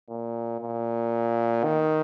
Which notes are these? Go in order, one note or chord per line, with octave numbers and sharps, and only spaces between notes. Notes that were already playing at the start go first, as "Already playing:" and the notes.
A#2
A#2
D#3